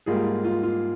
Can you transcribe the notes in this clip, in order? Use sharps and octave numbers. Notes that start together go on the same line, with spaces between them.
G#2 G3 A#3 F4 G#4
F4
F4
F4